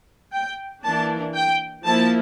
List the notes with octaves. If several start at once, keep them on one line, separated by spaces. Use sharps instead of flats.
G5
E3 A#3 D4 A5
G5
F3 A#3 E4 A5